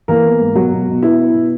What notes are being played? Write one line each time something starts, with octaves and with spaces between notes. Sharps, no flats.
E3 A#3 A#4
B3
G#2
B2 F#3 F#4
B2
B2
B3 E4
B3
B2